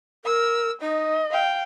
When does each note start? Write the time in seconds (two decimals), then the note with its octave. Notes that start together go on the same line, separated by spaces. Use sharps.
0.25 A#4 E6
0.81 D#4 D#5
1.31 F5 G5